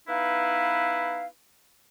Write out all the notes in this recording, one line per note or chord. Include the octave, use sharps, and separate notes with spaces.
B3 D#4 E4 B4 F5